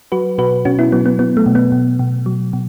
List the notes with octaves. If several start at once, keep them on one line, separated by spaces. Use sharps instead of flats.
F#3 F#4 B4
B2 F#4 B4
B2 C#4 F#4
B3 E4
F#3 B3
B3
F#3 B3
A3
B2
B3
B2
B2
F#3
B2